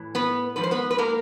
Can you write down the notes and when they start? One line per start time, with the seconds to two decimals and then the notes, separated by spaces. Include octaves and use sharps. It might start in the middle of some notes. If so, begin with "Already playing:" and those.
Already playing: A2 E3
0.15 B3 B4
0.56 G#2 F3 B4
0.63 C5
0.71 B3 B4
0.91 B4
0.98 A#3 A#4